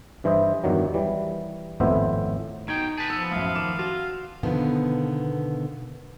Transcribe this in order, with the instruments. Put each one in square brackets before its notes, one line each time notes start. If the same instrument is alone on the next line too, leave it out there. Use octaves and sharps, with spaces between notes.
[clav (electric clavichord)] G2 E3 E4 C5 D#5
E2 G2 D#3 F#3
E3 G3
G#1 F2 A2 B3 C5 E5
[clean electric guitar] B2 G5 [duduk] D#4 [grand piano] G#6
[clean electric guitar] G#4 B4 [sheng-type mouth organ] A5
[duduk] F3 [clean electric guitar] B3 [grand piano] E6
[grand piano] F#2 A2 [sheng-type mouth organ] F5
[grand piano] D#3 D6 E7
[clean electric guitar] F4 [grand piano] F#4
[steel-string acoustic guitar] B2 D3 D#3 F3 B3